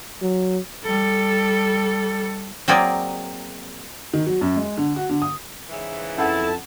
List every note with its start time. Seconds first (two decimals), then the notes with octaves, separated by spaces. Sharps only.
0.22 F#3
0.84 G3 A4
2.68 F#3 A#3 C4 G#4 A#4 D5
4.13 D#3
4.27 F#3
4.41 F#2
4.56 G#3
4.77 D3
4.96 F#4
5.09 D3
5.22 D#6
5.70 G#2 C#3 E3
6.18 F2 C#4 E4 A4 F#5 A5 E6